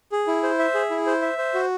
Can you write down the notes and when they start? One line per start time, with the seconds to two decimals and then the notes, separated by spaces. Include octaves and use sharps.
0.12 G#4
0.28 E4
0.43 C5
0.59 E5
0.74 G#4
0.90 E4
1.06 C5
1.22 E5
1.38 C5
1.54 F#4